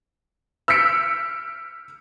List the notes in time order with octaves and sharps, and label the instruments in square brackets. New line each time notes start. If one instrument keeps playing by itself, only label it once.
[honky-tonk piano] E6 F6 G6 B6 C#7 D7